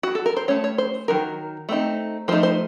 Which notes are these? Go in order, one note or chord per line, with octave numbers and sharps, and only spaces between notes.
F#4
A4
A#4
C5
A3 C#4 C#5
C#5
C5
D#3 F#3 A#4
A3 C4 D#4
F3 A3 D#4 C5
C5